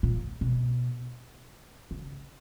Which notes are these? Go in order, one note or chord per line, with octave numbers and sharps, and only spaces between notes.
A#2
B2
C#3